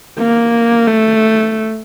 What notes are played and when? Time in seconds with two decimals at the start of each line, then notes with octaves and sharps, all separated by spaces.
0.19 A#3
0.87 A3